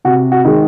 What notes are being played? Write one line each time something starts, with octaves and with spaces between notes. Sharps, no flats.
C3 F#4
F#4
D#3 G#3